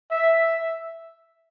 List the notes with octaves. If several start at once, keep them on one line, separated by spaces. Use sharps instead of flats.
E5